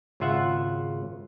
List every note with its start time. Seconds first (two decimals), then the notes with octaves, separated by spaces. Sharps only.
0.20 G#1 C#3 F4 E5 F#5